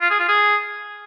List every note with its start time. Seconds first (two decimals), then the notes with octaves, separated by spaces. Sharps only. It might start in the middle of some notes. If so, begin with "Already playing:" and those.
0.01 F4
0.10 G#4
0.19 F4
0.28 G#4